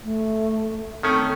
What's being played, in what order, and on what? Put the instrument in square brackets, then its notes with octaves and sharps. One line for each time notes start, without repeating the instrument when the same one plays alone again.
[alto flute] A3
[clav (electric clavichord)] D#3 C#4 [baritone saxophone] A3 [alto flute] C4